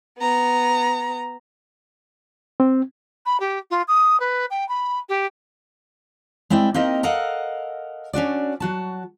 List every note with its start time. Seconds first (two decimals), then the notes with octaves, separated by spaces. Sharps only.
0.19 B3 A#5
2.60 C4
3.26 B5
3.40 G4
3.71 F4
3.88 D#6
4.20 B4
4.50 G5
4.69 B5
5.09 G4
6.50 G#3 C4 E4 D5 G5
6.74 A#3 C4 D#4 G4 A#4 D#5
7.03 A4 A#4 D#5 F5 F#5
8.13 C#4 D4 F#4 D5
8.60 F#3 F#4 A5